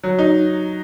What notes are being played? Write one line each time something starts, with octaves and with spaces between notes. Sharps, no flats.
F#3
D#4